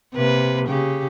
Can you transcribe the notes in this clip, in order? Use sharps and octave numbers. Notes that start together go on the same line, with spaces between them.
C3 A#3 B4
C#3 G4